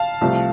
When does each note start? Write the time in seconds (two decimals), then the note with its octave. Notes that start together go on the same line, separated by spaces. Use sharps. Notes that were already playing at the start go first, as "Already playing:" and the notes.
Already playing: F5 A5
0.21 C2 C3 F3 A3